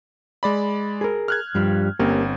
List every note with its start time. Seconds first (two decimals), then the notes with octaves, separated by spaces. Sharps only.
0.43 G#3 D5 B5
1.01 G#4 A#4
1.28 F6 F#6 G#6
1.55 G2 F3 G3
1.99 G1 A#3 C4 C#4 G4